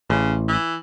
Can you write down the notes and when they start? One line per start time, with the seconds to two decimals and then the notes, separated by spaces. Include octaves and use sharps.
0.10 A1 C#3
0.48 E3